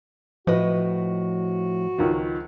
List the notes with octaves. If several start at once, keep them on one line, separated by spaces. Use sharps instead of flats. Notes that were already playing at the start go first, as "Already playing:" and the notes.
A2 F3 F#4 B4 D#5
C#2 D#3 F3